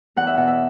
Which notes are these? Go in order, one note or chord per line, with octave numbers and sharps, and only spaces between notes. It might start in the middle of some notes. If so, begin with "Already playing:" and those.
E2 F#5
E5
B2 F#5
E5